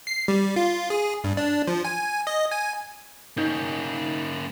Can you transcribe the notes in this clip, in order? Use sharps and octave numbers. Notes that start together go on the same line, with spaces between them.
C7
G3
F4
G#4
G2
D4
F3
G#5
D#5
G#5
A#3 C#4 D#4 G6